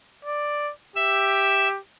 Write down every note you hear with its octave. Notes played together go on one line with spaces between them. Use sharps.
D5
G4 E5 E6